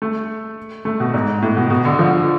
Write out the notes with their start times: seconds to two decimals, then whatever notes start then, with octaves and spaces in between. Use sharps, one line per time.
0.02 A3
0.85 A3
1.00 B2
1.14 G#2
1.42 A2
1.57 B2
1.70 B2
1.85 D3
1.99 F3